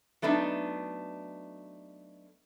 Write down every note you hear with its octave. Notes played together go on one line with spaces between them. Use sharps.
F#3 A3 B3 D4 D#4